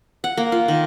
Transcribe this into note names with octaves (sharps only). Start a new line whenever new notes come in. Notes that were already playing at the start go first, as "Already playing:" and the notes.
F#5
A#3
F4
D#3